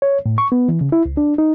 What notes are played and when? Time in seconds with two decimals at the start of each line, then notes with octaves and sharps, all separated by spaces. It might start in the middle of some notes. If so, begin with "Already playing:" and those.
0.02 C#5
0.26 A2
0.38 C#6
0.52 B3
0.69 E3
0.81 C#3
0.92 E4
1.06 C#2
1.17 D4
1.38 D#4